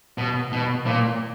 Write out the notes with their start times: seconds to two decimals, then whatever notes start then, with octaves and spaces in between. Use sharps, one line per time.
0.18 B2
0.52 B2
0.87 A#2